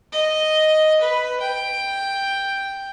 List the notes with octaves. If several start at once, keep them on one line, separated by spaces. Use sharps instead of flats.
D#5
B4
G5